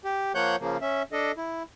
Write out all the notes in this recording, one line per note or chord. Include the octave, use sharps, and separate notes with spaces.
G4
F3 A#3 C#5 F#5 F#6 G6
C#3 F3 A#3
C#4 E5
D4 A4 D#5
E4